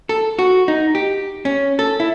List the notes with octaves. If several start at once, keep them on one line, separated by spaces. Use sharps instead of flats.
A4
F#4
D#4
G4
C#4
A4
E4